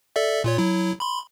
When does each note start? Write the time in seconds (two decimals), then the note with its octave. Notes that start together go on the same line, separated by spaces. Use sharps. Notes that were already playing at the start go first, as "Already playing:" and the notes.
0.16 A4 D5 E5
0.44 A#2 F4 C#5
0.58 F#3 E4
1.00 B5 C6